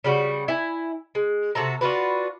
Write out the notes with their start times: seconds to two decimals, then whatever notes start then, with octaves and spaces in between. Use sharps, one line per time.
0.04 C#3 G3 F#4
0.48 E4 G#5
1.15 G#3
1.55 C3 F#4 A4 A#5
1.81 D4 F4 F#4 B4